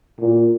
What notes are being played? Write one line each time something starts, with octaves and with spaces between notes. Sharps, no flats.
A#2